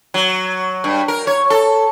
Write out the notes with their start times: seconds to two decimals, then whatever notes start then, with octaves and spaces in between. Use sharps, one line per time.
0.14 F#3
0.84 G2
1.08 A#4
1.27 C#5
1.50 A4